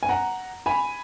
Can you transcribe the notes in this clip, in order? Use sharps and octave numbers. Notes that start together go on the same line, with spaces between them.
G#5
F#5 A#5
G#5 B5